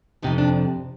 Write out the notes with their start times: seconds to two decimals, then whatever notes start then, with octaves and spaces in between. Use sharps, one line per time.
0.22 F2 C3 F3 D#4
0.38 D4